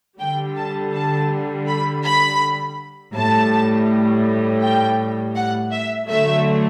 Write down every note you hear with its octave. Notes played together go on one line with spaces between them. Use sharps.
D3 G3 G5
A5
A5
B5
B5
A2 G3 A5
G5
F#5
E5
D3 F#3 A3 E5